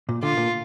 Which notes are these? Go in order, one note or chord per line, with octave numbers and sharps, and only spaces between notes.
A#2
D3 F4
A#2